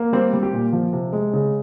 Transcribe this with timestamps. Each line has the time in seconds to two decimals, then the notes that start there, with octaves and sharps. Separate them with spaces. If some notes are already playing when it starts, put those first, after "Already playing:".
Already playing: A#3
0.13 G3 C4
0.33 G3
0.43 G4
0.53 A#2
0.73 F3
0.93 C3
1.13 G#3
1.33 C#3